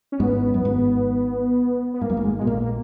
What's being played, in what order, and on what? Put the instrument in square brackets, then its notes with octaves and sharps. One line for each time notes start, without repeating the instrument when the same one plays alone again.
[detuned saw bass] C#4
[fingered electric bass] G#1 G#2 [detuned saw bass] B3
[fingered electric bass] F#2
G#1 G#2
[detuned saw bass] B3
[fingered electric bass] G#2 [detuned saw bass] A#3
[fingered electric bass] F#2
G#1 G#2
[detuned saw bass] G#3
[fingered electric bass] B2 [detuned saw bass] G#3
[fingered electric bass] A#1 A#2 [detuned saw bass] A#3
[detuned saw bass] A#3